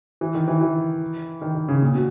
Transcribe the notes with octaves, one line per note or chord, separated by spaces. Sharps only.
E3
D#3
E3
E3
D#3
D#3
C#3
A#2
B2